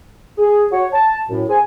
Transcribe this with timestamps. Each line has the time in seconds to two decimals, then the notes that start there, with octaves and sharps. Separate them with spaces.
0.38 G#4
0.72 F#4 C#5
0.93 A5
1.30 F#2 A2
1.49 C4 G#4 G#5